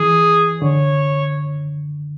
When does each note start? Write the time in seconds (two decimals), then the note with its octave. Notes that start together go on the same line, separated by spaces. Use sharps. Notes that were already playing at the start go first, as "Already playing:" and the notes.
Already playing: E3 G#4
0.61 D3 C#5